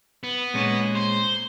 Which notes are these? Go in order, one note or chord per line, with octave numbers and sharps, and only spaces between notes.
B3
A#2 G#3 C#4
C5